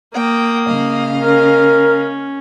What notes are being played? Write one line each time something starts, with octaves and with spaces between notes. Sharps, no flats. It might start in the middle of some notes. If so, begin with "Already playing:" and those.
A#3 G5 D#6
C#3 D#5 F5
C#4 A#4